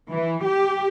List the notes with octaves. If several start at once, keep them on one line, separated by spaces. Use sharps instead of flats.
E3
G4